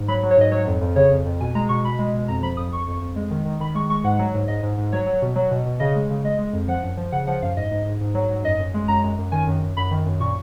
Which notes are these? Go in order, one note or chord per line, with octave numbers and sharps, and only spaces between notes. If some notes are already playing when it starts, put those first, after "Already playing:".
Already playing: G#2
F#3 B5
F#3
C#5
G#2 D#5
F#3 C#5
F2
F2
C#3 C#5
F2
F2
B2 G#5
G#3 A#5
B2 C#6
B2 B5
G#3
B2
F2 A#5
F3 B5
F2 D#6
F2 C#6
F2
F2
G#3
D#3
D#3
D#3 B5
G#3 C#6
G#3 C#6
G#2 F#5
F#3
G#2
G#2 D#5
G#2
G#2
F#3 C#5
F#3
B2
F#3
B2
B2
C#3 D#5
G#3
C#3
G#3 D#5
G#3
F2
F3 F#5
F#2
F3
C#3 F#5
F3 F#5
F#2 F5
G#2 D#5
G#2
G#2
G#2
F#3
G#2
F#2 D#5
F#2
G#3
F#2 A#5
F#2
F#2
D#3 G#5
F#2
F#2
F#2 B5
D#3
F#2
A#2 C#6